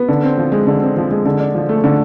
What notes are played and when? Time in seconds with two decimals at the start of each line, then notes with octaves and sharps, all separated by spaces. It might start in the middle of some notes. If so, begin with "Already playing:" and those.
Already playing: B3
0.09 D3
0.23 C4
0.38 F3
0.52 G#3
0.67 D3
0.82 C4
0.97 F3
1.11 G#3
1.25 D3
1.40 D4
1.55 F3
1.69 A3
1.84 D3